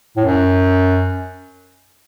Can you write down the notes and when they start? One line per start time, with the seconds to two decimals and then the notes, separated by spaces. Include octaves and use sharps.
0.17 A2
0.25 F#2